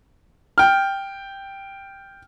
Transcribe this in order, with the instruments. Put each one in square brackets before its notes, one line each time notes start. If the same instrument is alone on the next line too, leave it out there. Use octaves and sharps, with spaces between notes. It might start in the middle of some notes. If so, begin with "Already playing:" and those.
[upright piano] G5 F6